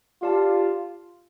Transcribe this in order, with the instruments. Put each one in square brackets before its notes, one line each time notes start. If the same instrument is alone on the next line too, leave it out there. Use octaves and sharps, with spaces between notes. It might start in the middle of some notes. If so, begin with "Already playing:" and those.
[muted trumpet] F4 [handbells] G4 D5 F5 A5